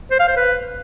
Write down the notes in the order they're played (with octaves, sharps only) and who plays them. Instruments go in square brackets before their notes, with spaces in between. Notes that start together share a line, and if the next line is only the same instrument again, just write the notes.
[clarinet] C5
F5
C5
B4